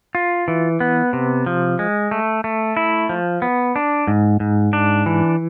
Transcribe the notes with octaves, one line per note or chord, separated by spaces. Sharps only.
F4
E3
B3
C3
F3
G#3
A3
A3
E4
F3
B3
D4
G#2
G#2
D4
E3